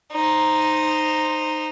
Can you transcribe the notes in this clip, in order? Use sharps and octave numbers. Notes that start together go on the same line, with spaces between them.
D#4 C5